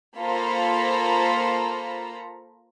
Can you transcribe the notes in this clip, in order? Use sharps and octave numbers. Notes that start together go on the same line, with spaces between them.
A#3 F4 A4 C5 A#5 B5